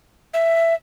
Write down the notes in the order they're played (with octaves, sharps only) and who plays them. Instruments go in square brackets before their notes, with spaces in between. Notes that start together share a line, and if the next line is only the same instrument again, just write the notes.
[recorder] E5